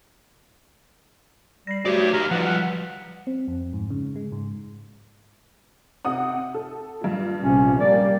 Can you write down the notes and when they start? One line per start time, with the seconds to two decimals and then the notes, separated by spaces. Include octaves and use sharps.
1.67 G3 A#6 C7
1.86 F#3 A3 F#4 G4 B4 D5
2.14 D#4 G4 A#5 F6
2.31 F3 G3 F4 B4 F#5
3.27 C4
3.48 F2
3.73 G#2
3.90 C#3
4.16 G#3
4.32 G#2
6.05 C3 F#5 D#6
6.54 A4
7.01 G2 A#2
7.40 A#1 C3 C#4
7.79 G3 A#3 D5